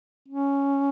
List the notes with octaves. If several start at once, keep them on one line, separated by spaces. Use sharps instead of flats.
C#4